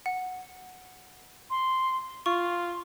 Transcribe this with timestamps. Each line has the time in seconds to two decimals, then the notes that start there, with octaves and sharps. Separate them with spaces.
0.06 F#5
1.50 C6
2.26 F4 C6 C#6